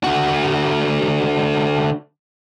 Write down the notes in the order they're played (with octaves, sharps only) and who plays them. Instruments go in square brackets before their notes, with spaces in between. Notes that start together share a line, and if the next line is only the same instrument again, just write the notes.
[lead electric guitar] D3 F#4